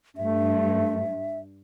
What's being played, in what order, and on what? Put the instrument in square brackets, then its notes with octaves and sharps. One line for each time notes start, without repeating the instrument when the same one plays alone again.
[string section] G2 [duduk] A3 [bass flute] E5